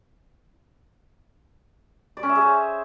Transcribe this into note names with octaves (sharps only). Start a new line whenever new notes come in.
D5
C#4
E5
G#4
C5